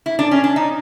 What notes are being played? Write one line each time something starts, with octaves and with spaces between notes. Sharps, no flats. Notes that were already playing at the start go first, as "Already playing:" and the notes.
E4
D4
C#4
D4
D#4